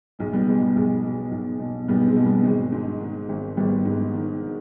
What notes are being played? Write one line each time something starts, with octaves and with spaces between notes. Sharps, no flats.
B1 G#3
G3 B3
B2 G#3
G3
B1 G#3
B2
B1
B2
B1 G3 B3
G#3 C4
B2
G3 B3
G#1 G#3
G#2
D#3
G#1
G#1 G3 B3
G#2
D#3